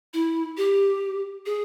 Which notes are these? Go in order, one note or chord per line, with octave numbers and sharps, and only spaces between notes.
E4
G4
G#4